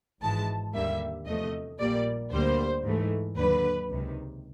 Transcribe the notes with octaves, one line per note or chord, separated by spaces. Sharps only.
G#1 G#2 E3 G#3 A5
D#2 D3 G3 A#3 E5
E2 C3 F3 A3 D#5
A#1 A#2 G3 A#3 D5
D2 D3 G3 A#3 C5
G#2 E3 A3
D#2 D3 F#3 B4
C#2 C3 D#3